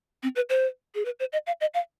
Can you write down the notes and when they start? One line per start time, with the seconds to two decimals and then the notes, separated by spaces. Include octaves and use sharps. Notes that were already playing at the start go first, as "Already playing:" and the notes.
0.23 C4
0.36 B4
0.50 C5
0.95 G#4
1.05 B4
1.20 C5
1.33 D#5
1.47 F5
1.61 D#5
1.74 F5